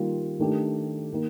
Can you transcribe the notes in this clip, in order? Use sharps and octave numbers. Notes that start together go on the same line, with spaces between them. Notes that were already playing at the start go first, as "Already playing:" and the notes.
Already playing: D#3 G3 A#3 F4
D#3 A3 D4 G4
D#3 A#3